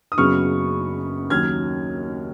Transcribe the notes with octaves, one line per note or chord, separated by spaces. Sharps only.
D#6
F#1 F#2 C#3 F#3 B3 C#6 F6
D#2 D#3 F#3 C#4 F6 G#6